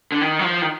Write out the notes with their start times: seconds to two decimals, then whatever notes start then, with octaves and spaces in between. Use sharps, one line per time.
0.12 D3
0.21 D#3
0.39 F#3
0.44 F3
0.62 D#3